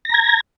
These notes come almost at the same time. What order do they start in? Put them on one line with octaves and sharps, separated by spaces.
A#6 A#5 G#6